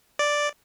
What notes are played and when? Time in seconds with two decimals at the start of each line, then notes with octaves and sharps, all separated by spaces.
0.19 D5